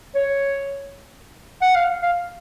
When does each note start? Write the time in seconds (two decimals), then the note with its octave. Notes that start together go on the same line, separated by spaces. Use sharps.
0.15 C#5
1.62 F#5
1.75 F5
2.02 F5